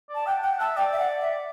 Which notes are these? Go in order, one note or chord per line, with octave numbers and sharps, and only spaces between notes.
D5
A5
F#5 G5
F#5 G5
E5 A5
D5 G5
E5
F#5
E5